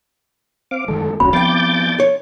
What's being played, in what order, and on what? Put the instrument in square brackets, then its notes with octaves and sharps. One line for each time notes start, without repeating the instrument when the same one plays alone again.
[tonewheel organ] C4 F5 D6
[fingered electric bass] F#2 D#3 G#3 [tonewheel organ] A4
[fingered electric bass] E1 C2 [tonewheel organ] C#4 F#4 [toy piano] B5
[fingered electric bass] F3 B3 C4 [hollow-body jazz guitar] F5 G5 [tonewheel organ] D6 G6 A6
[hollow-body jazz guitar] C#5